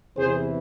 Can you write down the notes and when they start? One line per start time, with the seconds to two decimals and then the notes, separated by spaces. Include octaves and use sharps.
0.16 E2 C3 E3 G#4 C5